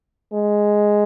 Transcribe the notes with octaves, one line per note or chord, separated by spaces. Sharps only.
G#3